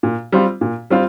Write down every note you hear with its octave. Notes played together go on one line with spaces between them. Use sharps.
A#2
G3 C4 F4
A#2
G3 C4 F4